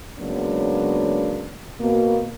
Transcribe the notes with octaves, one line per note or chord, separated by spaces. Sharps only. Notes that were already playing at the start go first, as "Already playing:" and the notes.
C#3 F#3 G#3 A#3 B3 D4
B2 A#3